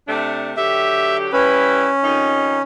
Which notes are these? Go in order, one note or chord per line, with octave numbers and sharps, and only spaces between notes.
C3 A3 D4
D3 F#3 G4 E5
G3 C#4 E4 B4
F2 D#3 D#4